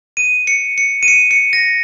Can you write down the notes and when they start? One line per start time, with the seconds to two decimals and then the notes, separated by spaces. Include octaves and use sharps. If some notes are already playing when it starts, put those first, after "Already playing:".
0.17 D#7
0.47 C#7
0.78 C#7
1.03 D#7
1.08 C#7
1.31 C#7
1.53 A#6